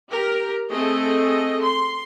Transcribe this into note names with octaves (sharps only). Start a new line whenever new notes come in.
G4 A#4 A#5
A3 C4 G#4 A4 D#5
C6